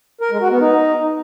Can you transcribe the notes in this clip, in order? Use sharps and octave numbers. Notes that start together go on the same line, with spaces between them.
A#4
G#3
F#4
B3
D#4